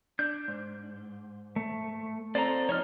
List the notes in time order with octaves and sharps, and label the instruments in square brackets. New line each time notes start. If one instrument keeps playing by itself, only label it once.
[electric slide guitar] D4 [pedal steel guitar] G6
[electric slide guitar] G#2
[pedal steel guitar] A3
[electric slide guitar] C4 A4 [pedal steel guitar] D5 A#5
[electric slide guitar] F2 D#4 [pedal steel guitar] C#5 D#5 F6